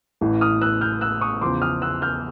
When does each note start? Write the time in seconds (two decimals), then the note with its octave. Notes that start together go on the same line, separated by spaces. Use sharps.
0.21 A1 A2 E3
0.41 D#6 F6
0.61 E6 F#6
0.81 F6 G6
1.01 E6 F#6
1.21 C#6 D#6
1.41 E2 C#3 F3 C6 D6
1.62 D#6 F6
1.82 E6 F#6
2.02 F6 G6